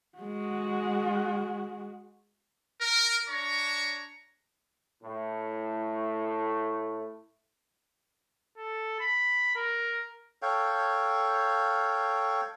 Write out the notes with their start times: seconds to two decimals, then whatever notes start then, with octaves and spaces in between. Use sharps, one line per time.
0.18 G#3 F#4
2.82 A#4
3.29 D4 C#5 A#5 C#6
5.04 A2 A3
8.58 A4
9.00 B5
9.55 A#4
10.42 A4 C#5 F5 G5